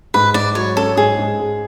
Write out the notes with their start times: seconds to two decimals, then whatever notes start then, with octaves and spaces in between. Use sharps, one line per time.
0.14 G#2 B4
0.34 G#2 D5
0.55 F#3 C#5
0.76 C#4 A4
0.97 G#2 G#4
1.19 G#2
1.39 G#3